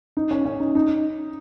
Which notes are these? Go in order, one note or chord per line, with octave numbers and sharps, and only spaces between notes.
D#4
C#4
C#4
D#4
D#4